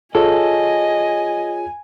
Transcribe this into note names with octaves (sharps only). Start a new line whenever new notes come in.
F4 G#4 A4 C#5 D#5 G#5